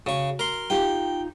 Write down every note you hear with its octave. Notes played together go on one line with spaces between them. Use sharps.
C#3 F#4 C#6
A#4 C6
D#4 F4 G4 G5